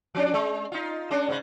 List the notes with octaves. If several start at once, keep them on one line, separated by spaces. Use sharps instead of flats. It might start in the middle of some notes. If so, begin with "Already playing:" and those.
F3 C#4 D4
G#3
D#4 F4
G#3 C#4 D4
G#2 C#3